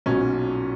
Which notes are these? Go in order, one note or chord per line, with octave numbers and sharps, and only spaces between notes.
B1 A#2 F#3 C#4